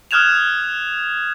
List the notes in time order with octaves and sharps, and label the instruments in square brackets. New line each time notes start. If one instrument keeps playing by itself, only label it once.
[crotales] D#6 F6 F#6 G#6 E7 F7